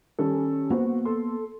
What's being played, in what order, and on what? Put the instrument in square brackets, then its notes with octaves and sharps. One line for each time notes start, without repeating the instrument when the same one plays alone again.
[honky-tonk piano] D#3 G3 A4 [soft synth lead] C#4
[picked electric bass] A#3 B3 [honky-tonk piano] F#4 C5
[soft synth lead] A4 [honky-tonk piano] C6